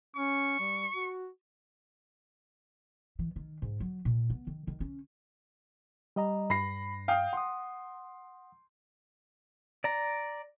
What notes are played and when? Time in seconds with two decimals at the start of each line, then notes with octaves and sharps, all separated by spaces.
0.16 C#4 C#6
0.59 G3
0.95 F#4
3.19 E3
3.36 D#3
3.62 G#2
3.80 F#3
4.05 A#2
4.30 B3
4.47 D#3
4.67 D#3
4.80 C#4
6.16 G3 D#5 A#5
6.50 G2 B5 A#6 C7
7.08 F5 G5 D#6
7.33 F#5 C6 D#6
9.84 D5 A#5